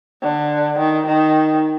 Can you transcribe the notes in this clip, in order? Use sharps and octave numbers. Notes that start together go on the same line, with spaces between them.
D3
D#3
D#3